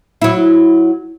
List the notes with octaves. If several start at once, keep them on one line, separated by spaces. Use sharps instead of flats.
F#3 E4